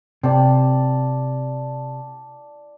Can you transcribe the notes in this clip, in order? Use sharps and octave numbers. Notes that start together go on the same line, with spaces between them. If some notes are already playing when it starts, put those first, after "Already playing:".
C3 D5 G5 A5